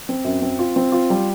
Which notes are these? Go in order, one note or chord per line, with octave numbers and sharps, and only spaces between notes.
C4
F#2
C4
F4
C4
F4
G3